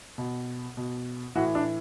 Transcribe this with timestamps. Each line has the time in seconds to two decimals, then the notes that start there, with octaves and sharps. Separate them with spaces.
0.18 B2
0.77 B2
1.35 A2 E3 F#4
1.55 D4